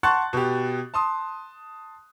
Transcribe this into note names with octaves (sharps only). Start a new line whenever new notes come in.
F#5 A5 C6 C#6 F#6 A6
B2 G4
A5 C6 D#6